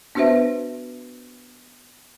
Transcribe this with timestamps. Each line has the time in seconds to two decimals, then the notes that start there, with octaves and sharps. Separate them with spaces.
0.15 B3 D4 F#4 B4 C5 E5